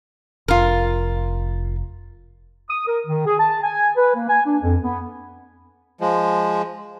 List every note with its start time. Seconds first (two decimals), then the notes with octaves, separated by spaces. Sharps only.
0.48 F1 F4 A#4
2.70 D#6
2.88 A#4
3.07 D#3
3.27 G#4
3.39 A5
3.63 G#5
3.97 B4
4.15 A#3
4.29 G#5
4.46 D4
4.62 F2
4.82 B3
6.01 F3 G#3